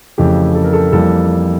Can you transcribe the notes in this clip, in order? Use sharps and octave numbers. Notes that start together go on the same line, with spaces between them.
F2 C#3 E3 A3 G4
A4
A#4
A4
F2 E3 G3 A#3 A4